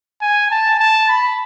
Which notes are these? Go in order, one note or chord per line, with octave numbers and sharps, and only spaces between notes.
G#5
A5
A5
B5